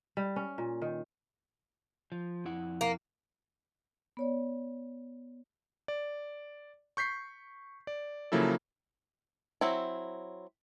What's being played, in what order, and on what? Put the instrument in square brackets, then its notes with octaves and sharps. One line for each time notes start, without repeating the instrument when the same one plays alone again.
[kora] G3
C#4
A#2
D#3
[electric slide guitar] F3
F2 E4 F#5
[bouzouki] A#3
[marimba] B3 C#5 D5
[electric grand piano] D5
C#6 G6 B6 C7
D5
C#3 F3 F#3 A#3 E4 A4
[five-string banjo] F#3 C4 E4